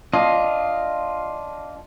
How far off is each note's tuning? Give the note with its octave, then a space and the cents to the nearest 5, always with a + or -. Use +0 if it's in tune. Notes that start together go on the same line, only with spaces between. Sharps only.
D4 -10 F4 +0 D#5 +0